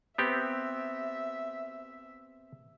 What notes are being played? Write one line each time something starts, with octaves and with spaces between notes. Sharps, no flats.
B3 C4 G4 E5